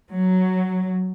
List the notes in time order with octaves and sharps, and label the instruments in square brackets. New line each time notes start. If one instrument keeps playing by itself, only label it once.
[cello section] F#3